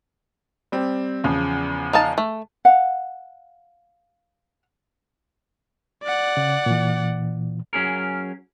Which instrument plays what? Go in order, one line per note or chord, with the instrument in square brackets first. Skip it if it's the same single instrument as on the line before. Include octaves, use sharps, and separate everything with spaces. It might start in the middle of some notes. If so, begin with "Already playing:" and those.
[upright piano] G3 C4
E2 C#3 F3
[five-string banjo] D#4 F5 A5
A3
[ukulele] F5 F#5
[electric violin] D5 F#5
[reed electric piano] C#3
A#2 E3
[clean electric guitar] F#3 C#4 G#4 A#4